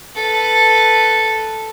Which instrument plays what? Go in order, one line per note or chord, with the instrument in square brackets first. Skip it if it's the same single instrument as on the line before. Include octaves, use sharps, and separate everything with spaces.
[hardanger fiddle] A4 B4